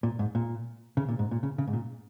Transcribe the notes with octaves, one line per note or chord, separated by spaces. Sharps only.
A#2
G#2
A#2
C#3
A#2
G#2
A#2
C#3
C#3
G#2
A#2